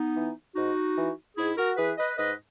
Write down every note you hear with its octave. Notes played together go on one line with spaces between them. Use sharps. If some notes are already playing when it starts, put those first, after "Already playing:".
Already playing: B3 D#4
E3
G#2 D#4 F#4
E3
G#2 E4 G#4
F#4 A#4
E3 G#4 B4
B4 D#5
G#2 B4 D#5